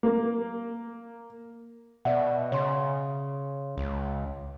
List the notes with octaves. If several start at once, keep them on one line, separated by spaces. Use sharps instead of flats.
A#3
B2 D5 E5 F#5
C#3 C#5 C6
C#2